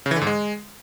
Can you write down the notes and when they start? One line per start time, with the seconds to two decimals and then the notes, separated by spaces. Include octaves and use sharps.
0.06 C#3
0.11 E3
0.16 D3
0.21 G#2
0.27 G#3